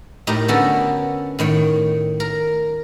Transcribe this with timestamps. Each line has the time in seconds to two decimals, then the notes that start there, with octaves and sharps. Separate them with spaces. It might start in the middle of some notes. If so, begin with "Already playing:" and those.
0.27 A2 D#4 G4 A#4
0.48 D3 B3 C#4 F#4 A4 A#4
1.39 A2 D#3 C#5
2.20 A#4